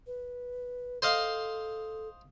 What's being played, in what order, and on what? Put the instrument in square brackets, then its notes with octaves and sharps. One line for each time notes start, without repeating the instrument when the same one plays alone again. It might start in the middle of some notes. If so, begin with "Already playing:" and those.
[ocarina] B4
[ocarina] A4 [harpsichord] C5 D#5 F5